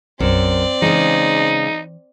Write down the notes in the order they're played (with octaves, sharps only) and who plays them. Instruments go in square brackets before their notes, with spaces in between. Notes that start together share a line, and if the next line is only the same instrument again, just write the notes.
[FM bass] B1 [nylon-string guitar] F#2 [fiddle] C4 D5
[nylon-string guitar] C#3 G#3 [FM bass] E3 [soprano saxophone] D#4